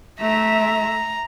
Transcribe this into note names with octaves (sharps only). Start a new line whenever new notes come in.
A3 E5 A#5